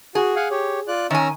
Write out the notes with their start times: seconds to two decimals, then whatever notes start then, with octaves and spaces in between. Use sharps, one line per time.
0.15 F#4 G#4
0.36 F5 F#5 G#5
0.51 G4 C#5
0.88 F4 D5 F#6
1.11 D#3 C#4 G#5 A#5 E6